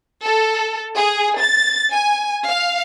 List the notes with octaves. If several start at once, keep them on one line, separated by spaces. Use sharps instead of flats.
A4
G#4
A6
G#5
F5